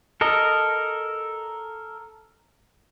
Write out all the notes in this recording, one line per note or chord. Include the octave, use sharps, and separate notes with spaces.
A4 A#4 D#5